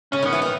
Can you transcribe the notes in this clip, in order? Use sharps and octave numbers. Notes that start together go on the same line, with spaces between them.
C#3 C#4
D#3 B3
E3
D#3